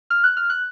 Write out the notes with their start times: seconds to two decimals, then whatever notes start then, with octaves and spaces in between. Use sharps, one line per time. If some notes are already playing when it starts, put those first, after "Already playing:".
0.10 F6
0.24 F#6
0.37 F6
0.50 F#6